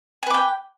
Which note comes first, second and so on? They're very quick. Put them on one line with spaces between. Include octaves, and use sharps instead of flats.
G#5 B4 D6 G5